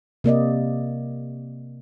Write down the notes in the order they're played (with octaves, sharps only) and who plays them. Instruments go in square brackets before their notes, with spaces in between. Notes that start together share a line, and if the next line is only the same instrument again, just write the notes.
[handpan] C3 A#3 D5 D#5